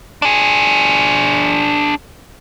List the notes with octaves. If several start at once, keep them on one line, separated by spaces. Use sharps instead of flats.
D4 G#4